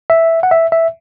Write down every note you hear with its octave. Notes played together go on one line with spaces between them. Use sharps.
E5
F#5
E5
E5